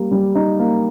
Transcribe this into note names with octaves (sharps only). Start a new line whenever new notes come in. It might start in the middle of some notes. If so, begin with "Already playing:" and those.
Already playing: G3 A#3
G3
D#4
A#3